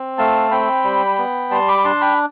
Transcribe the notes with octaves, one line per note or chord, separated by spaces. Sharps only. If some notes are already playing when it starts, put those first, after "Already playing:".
Already playing: C4
A3 F5 A5
C4 G5 B5
G3
B3
G3 A5 C6
B5 D6
D4 A5 C6
G5 B5